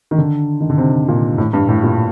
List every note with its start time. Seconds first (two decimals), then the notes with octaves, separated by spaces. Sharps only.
0.11 D#3
0.18 D3
0.60 D#3
0.70 D3
0.78 C3
1.08 A#2
1.38 A2
1.53 G2
1.69 A2
1.83 A#2